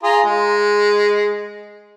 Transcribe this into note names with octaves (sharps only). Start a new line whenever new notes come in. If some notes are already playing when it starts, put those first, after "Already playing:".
F4 G#4 A#5
G#3